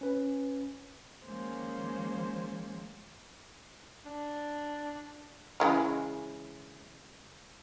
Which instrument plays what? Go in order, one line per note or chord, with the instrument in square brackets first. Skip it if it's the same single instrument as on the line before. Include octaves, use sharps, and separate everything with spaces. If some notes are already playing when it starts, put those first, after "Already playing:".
[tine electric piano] C#4 B4
[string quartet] D#3 F3 G#3 A#3 C#4 C5
[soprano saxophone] D4
[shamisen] C#3 E3 G#3